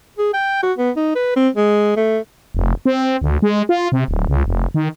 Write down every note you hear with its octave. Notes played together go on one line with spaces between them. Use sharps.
G#4
G5
F#4
B3
D#4
B4
C4
G#3
A3
F1
C4
D2
G#3
F4
C3
D1
C#2
F1
D#3